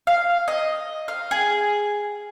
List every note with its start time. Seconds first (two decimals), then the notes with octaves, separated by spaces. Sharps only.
0.07 F5
0.48 D#5
1.08 F5
1.31 G#4